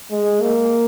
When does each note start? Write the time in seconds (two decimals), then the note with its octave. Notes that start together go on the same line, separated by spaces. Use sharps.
0.11 G#3
0.41 A#3